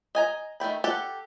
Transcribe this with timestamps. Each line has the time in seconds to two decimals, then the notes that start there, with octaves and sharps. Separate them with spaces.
0.15 D#5 G#5 A#5
0.60 D#3 A3 G5 B5
0.84 G4 A4 F#5 A5